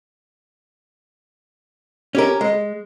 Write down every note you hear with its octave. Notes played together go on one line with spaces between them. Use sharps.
C#4 G4 A#4
G#3